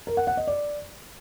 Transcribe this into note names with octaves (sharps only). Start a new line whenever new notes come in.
A#4
F#5
F#5
D#5
D5